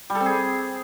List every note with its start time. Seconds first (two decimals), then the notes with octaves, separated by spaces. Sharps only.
0.10 G3
0.15 A4
0.20 C4
0.26 G#4